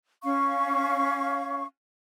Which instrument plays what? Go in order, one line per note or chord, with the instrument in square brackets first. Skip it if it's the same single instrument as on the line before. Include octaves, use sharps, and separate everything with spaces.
[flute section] C#4 F5 C#6